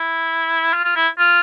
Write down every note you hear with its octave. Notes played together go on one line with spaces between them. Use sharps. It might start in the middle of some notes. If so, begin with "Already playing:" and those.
Already playing: E4
F4
F4
E4
F4